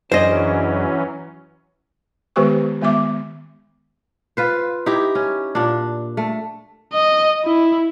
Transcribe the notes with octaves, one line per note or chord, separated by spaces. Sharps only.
F#2 E3 F#3 C#4 D4 G#4 C5 D#5
D#3 G#3 B3 G4 B4 C#6
D#3 G#3 B3 E5 D6
F4 B4 C5
D#4 E4 G4
C#4
A#2 D4
A3
D#5
E4